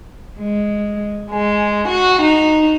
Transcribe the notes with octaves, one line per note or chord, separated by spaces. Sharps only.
G#3
G#3
F#4
D#4